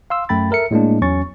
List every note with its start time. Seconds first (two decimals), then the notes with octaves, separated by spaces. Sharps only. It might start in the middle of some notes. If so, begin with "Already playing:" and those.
0.10 F5 C6 E6
0.29 F#2 A3 G5 B5 A6
0.51 A4 A#4 E5 C#7
0.71 A2 G#3 A#3 D4
1.01 E2 F#3 C#4 C#6 A6